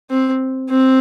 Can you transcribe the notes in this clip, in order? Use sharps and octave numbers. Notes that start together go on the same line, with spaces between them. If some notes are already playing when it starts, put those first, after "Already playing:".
C4
C4